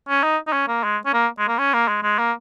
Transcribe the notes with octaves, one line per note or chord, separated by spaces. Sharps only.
C#4
D#4
D#4
C#4
A#3
G#3
C#4
A#3
G#3
A#3
C#4
A#3
G#3
G#3
A#3